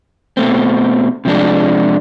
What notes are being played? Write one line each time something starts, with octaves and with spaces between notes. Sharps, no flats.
B2 A3 C4
C3 F3 G#3 D4